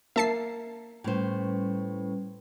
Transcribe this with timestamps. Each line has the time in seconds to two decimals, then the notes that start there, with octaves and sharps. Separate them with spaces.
0.16 A#3 E5 A5 C7
1.04 A2 G3 C#4 B4 C5